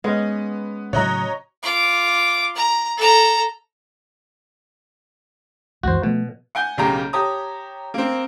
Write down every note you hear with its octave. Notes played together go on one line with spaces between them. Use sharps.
G#3 B3 C#4
A2 C#3 F#3 F#4 C#5 D#5 F#5 A#5
F4 D6
A#5
A4 A#5
C#2 F#2 E3 F#4 C5
B2 F3 A3 B3
F#5 G#5 G6
B1 C#3 A#3 G4 A#5
G4 C#5 A5 A#5 D#6
A#3 C4